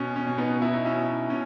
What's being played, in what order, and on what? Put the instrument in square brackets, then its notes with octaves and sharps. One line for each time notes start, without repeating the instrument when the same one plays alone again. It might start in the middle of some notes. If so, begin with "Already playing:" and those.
Already playing: [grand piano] B2 C#4
C#4
B2
B3 D#4
B2 E4
D#4
C#4 E4
B2
B2 C#4